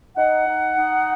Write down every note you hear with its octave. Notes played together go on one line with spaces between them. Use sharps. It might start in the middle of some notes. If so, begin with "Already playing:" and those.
D#4 F#5
D#4
D#4